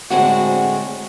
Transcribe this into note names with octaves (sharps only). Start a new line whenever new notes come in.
A2 D3 G#3 C4 D4 F#4